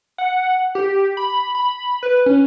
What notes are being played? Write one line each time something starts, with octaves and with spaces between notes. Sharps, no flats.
F#5
G4
B5
B5
B4
C#4